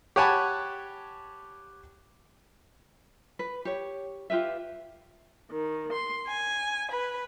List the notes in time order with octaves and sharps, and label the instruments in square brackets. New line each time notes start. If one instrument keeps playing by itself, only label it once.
[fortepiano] G4 C#5 F#5 G#5 A5 B5
[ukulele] B4
G4 C#5
F4 G4 B4 E5
[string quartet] D#3
C6
G#5
B4